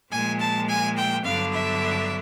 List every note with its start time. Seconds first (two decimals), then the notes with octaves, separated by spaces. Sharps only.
0.11 A#2 F3 G#3 G#5
0.39 A5
0.68 G#5
0.96 G5
1.24 G2 D3 F#3 B3 D4 F5
1.52 E5